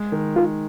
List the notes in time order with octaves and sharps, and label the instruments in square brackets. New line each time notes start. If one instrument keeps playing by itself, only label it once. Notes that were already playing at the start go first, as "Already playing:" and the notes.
Already playing: [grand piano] G#3
D#3
[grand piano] D#3 [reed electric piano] F4